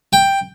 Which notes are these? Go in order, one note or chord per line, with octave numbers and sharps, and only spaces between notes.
G5